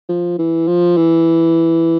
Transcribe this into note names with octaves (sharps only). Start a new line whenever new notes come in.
F3
E3
F3
E3